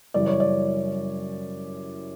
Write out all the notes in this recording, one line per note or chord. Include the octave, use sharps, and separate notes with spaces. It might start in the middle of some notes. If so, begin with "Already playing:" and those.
F#2 C#3 E3 G3 D5
C#5
D5